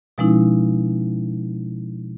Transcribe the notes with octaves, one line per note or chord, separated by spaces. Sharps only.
B2 F3 G#3 C#4 D#4 E4